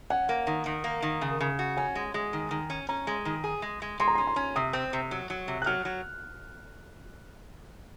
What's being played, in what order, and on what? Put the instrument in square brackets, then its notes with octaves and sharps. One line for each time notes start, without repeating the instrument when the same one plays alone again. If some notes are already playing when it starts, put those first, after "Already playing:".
[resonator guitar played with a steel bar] C#4 [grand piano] F#5
[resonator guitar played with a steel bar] A#3
D#3
D#3
A#3
D#3
C#3
C#3
F#4
[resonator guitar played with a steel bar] C#4 [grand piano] G#5
[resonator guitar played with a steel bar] G#3
G#3
D#3
D#3
C#4
[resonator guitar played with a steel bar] C#4 [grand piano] A#5
[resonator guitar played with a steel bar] G#3
D#3
G#4
G#3
G#3
[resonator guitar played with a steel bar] G#3 [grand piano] C6
[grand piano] A#5
[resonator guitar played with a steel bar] C#4 [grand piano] C6
[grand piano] C6
[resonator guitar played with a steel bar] C#4
[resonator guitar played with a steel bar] C3 [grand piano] D#6
[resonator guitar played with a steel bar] C4
C3
F#3
F#3
C3
[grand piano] F#6
[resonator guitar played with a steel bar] F#3 [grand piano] F6
[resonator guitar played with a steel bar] F#3